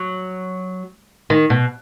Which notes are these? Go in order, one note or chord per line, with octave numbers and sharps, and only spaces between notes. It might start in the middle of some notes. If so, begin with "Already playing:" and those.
Already playing: F#3
D#3
B2